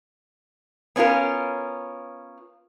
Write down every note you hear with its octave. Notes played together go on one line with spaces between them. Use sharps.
B3 C#4 D4 F4 A#4